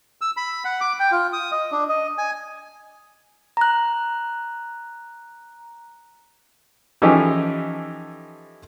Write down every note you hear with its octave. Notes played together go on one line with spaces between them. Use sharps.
E6
B5
F#5
D6
G5
F4
D#6
D#5
D4
D#5
G#5
A#5 F#6
E3 F3 C#4 D#4 G4 A4